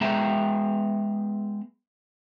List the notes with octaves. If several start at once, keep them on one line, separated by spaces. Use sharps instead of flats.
G#3 B3 G#4 E5 G5 A#5